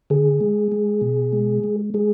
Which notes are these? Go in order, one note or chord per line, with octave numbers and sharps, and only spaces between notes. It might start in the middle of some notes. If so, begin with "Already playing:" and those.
D3 G#4
G#3
G#3
B2
G#3
G#3
G#3 G#4